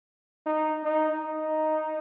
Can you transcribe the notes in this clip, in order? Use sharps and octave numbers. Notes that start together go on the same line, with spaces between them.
D#4
D#4
D#4